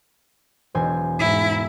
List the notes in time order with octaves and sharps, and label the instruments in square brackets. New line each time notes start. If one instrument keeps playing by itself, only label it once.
[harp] E1 C5 G#5
[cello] G#2 E4